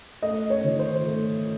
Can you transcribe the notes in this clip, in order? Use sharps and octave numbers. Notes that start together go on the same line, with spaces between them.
A3 D#5
C#5
D#3
C5
A3